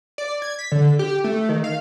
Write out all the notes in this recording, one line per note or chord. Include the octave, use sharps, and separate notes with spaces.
D5
G#6
B6
D3
G4
A3
D#3
F5